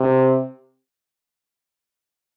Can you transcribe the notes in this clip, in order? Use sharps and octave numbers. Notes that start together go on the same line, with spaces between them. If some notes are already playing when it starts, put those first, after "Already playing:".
Already playing: C3